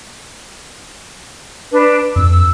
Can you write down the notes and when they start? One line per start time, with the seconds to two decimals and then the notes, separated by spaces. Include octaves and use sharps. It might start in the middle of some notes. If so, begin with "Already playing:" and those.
1.71 D4 B4
2.16 F2 E6